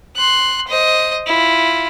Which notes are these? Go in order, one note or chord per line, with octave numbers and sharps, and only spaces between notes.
C6 F#6
C5 D#5
E4 F4